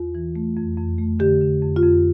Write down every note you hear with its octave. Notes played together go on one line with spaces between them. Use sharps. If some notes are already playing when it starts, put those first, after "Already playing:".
Already playing: E2 F4
E3
A3
F2
F2
A3
D3 G4
D3
F2
F4
F2